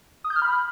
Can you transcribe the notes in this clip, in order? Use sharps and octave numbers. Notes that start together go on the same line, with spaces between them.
D#6
G6
F6
B5